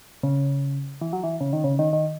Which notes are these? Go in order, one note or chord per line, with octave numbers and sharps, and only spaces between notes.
C#3
E3
F#3
E3
C#3
D#3
C#3
D#3
D#3